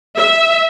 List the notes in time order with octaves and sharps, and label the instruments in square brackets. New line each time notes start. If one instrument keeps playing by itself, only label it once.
[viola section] E5